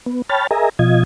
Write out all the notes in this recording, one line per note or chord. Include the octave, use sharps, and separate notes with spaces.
B3
C#5 G5 A5 B5 F6 A6
G#4 A#4 D#5 E5 G#5 A#5
B2 F3 F4 D#5 G#6